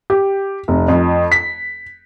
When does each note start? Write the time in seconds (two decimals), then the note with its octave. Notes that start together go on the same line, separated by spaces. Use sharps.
0.10 G4
0.68 F1
0.88 F2
1.32 B6